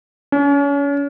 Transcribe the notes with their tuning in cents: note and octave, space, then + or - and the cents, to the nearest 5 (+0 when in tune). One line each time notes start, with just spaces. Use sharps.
C#4 +35